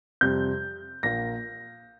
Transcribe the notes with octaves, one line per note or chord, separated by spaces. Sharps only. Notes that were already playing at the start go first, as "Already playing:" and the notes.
F2 C3 G3 C4 G6
A#1 A#2 A#3 A#6